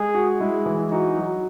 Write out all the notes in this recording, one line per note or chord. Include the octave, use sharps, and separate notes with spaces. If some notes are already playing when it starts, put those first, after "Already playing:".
Already playing: G#3 G#4
F#4
G#3 E4
E3
D#4 F#4
F#3